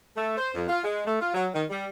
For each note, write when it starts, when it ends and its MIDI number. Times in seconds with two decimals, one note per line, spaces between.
0.17 0.34 57
0.37 0.50 72
0.55 0.66 41
0.69 0.79 65
0.84 1.06 56
1.07 1.21 57
1.21 1.32 65
1.34 1.48 54
1.54 1.64 51
1.70 1.87 55